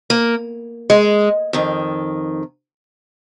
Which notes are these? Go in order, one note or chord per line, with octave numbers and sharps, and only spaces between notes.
A#3
G#3
F2 D#3